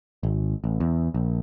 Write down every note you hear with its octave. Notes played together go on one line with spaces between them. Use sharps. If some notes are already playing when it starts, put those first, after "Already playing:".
G#1
A1
E2
A#1